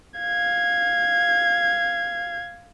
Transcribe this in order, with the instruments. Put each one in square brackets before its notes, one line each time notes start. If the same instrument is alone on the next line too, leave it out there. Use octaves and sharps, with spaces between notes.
[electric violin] F5 G#6